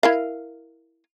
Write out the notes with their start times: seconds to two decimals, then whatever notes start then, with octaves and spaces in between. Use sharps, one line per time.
0.03 E4 A#4 F5